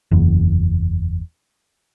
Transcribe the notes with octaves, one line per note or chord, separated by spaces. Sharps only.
F#1 E2